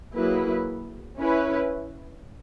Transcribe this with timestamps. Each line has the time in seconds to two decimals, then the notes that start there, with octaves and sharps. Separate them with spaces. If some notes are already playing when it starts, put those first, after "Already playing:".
0.14 F#3 A#3 E4 G#4 B4
1.18 C#4 E4 B4